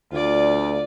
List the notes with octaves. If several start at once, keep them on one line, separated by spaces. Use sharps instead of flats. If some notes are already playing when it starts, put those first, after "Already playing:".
D2 F4 D5